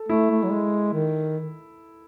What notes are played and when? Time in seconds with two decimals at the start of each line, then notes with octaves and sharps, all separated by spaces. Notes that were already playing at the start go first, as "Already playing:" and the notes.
Already playing: A4
0.09 A3 E4
0.30 A3
0.43 F#3
0.51 G#3
0.93 D#3